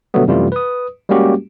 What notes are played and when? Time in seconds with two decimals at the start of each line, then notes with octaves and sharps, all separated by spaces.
0.14 B2 D3 F#3 G3 A3 B3
0.27 F#2 C3 E3 G3 A3 F4
0.52 B4 D#6
1.09 G3 G#3 A#3 C#4 F#4 G4